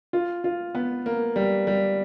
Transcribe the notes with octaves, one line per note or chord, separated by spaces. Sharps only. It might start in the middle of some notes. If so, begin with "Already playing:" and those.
F4
F4
B3
A#3
G3
G3